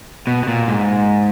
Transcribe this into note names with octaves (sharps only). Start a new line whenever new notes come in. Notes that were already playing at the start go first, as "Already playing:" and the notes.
B2
B2
A#2
G#2